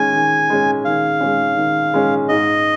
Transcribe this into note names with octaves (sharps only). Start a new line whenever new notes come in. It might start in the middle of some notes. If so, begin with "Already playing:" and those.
Already playing: D#3 G#3 C#4 G#5
D#3
G#3 C#4
D#3 F5
G#3 C#4
D#3
G#3 C#4
G#2 D#5